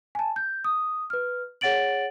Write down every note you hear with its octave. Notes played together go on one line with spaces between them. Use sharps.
G#5 A5
G6
D#6
B4 F6
G#4 C#5 F#5 A6 D7 F#7